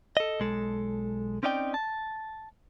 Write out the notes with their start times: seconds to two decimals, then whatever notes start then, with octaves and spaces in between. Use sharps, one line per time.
0.17 A4 D#5
0.40 B1 G#3 A4
1.43 C4 C#4 D#4 D5 G5
1.74 A5